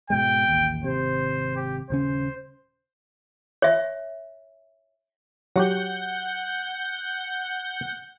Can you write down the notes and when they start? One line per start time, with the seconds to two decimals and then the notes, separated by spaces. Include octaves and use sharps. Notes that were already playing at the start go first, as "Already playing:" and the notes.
0.10 G#2 B2 G#3 G5
0.48 A1 D#2
0.84 G#1 C3 C5
1.56 G4
1.90 D#1 C#3 C#4 C5
3.62 C#5 E5
5.56 F#3 F#4 G4 F#5 G6